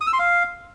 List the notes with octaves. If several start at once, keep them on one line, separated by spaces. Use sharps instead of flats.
D#6
E6
C6
F5